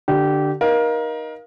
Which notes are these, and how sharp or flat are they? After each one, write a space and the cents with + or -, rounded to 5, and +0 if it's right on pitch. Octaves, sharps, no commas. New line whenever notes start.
D3 +15 G4 -20
D#4 +0 A#4 +25 F5 +0